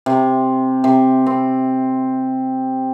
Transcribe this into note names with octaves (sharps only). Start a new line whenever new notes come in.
C3
C3
C4